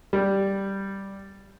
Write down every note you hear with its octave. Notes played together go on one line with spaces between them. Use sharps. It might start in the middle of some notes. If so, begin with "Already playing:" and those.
G3